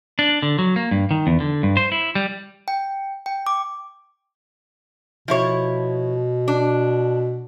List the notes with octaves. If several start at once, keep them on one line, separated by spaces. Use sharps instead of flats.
D4
D3
F#3
A#3
G2
D#3
E2
D3
G2
C5
E4
G3
G5
G5
D6
B2 F3 E4 C#5
D4